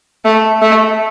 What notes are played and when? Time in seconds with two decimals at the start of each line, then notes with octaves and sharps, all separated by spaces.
0.25 A3
0.61 A3